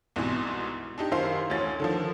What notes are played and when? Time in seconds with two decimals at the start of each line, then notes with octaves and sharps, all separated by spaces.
0.16 C2 G#2 B2 E3
0.98 D4 D#4 G4
1.11 F#2 D#3 E4 C5 F5 C6
1.50 D2 E3 C#4 A6
1.80 D3 D#3 F3